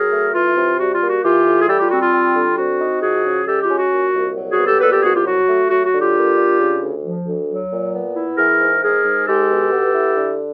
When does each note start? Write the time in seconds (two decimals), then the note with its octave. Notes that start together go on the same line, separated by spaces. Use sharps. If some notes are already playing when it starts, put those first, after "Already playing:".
Already playing: F#3 G#4 A#4
0.12 A3
0.34 E3 F4
0.56 C3
0.79 G3 F#4
0.93 F4
1.01 A#3
1.09 F#4
1.23 E3 F4 G4
1.46 A2
1.60 G#4
1.68 G3 G4 A4
1.80 F4 G4
1.91 C4 F#4
2.02 F4
2.14 G3
2.35 D3
2.58 C4 F#4
2.80 D#4
3.02 F3 F#4 G#4
3.25 C#3
3.47 G#3 G4 A4
3.62 F4 G4
3.69 C#4
3.77 F#4
3.92 A#2
4.15 C2
4.36 F#3
4.51 F#4 G#4
4.58 B3
4.66 G4 A4
4.81 A#2 A4 B4
4.92 G4 A4
5.03 C2 F#4 G#4
5.14 F4 G4
5.26 F#3 F#4
5.48 A3
5.70 F#3 F#4
5.86 F#4
5.92 D3
6.00 F4 G4
6.15 A#3
6.37 D4
6.60 C#3
6.82 D2
7.05 F3
7.26 D2
7.49 F#3
7.71 A#2
7.94 B3
8.15 E4
8.38 E3 G#4 A#4
8.60 G#2
8.82 G#3 G#4 A#4
9.05 G#2
9.27 G#3 G4 A4
9.49 B2
9.72 B3
9.94 E4
10.17 D3